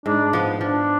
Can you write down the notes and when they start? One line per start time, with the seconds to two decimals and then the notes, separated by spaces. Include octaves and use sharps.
0.06 G#2 D4
0.33 F3 B3
0.61 F3 D4